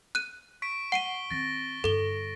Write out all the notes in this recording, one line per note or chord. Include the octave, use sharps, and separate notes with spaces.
F#6 D#7
C#6 B6 D7
F#5 B6 D7 D#7 G7
D#3 C4 A6 A#6
G2 D3 A4 G7